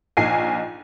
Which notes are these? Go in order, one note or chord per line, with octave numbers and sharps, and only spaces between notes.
A#1 D#4 G#5 C7